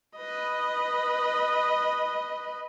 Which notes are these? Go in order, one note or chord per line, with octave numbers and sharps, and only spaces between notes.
B4 D#5